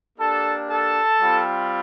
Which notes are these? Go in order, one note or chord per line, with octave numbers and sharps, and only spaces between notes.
A#3 D4 G4 A4 A5
A4 A5
G3 C4 F4